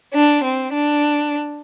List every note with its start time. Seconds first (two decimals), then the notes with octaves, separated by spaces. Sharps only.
0.14 D4
0.43 C4
0.73 D4